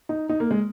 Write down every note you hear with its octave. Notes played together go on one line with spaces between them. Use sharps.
D#4
D#4
A#3
G#3